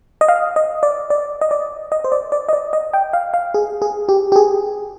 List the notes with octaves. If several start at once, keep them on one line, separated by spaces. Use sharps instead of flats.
D#5
F5
D#5
D5
D5
D#5
D5
D#5
C5
D5
D5
D#5
D5
D#5
G5
F5
F5
G#4
G#4
G4
G4
G#4